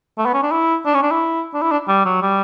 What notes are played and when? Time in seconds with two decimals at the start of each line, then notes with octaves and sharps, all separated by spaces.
0.18 A3
0.26 B3
0.34 C#4
0.43 D4
0.51 E4
0.86 D4
0.94 C#4
1.03 D4
1.11 E4
1.54 D4
1.62 E4
1.71 D4
1.88 G3
2.05 F#3
2.22 G3